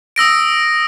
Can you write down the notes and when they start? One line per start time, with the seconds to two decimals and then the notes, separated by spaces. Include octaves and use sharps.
0.16 D#6 E6 A#6 D7